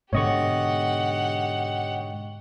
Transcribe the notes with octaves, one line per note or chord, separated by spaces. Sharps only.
G#2 B2 D3 G4 C#5 D#5 F#5 C#6